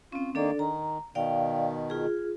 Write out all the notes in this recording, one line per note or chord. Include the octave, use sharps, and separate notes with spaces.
C4 C#4 F4
D#3 A#3 D4 A4 D5
D#3 A#5
B2 D#3 D5 F5 G5
F4 G#4